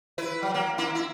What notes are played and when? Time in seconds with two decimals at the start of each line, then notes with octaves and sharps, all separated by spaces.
0.18 E4 B4
0.42 F#3
0.54 A#3
0.78 A#3 E4
0.95 E4